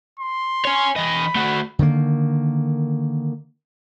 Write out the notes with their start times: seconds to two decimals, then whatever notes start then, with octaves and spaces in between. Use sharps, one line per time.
0.19 C6
0.65 C#5 G#5
0.96 E3 D#5 B5
1.35 A3 F#4
1.79 D3 D#3 G3 A#3